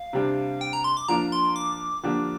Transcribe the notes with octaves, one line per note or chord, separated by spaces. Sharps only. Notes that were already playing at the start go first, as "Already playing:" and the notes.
Already playing: F5
C3 G3 D4 G4
G5
A#5
C6
D6
F3 A#3 D4 F4 A#4 A#5
C6
D6
D3 F3 A#3 D4 G4